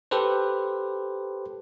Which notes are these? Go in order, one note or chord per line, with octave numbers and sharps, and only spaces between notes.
G4 A4 B4 C5